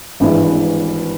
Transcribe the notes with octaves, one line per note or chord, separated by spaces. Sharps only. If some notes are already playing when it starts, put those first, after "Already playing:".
G#1 G2 E3 G#3